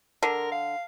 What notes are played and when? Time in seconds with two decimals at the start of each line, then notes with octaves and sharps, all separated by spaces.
0.23 D3 A#4
0.52 F5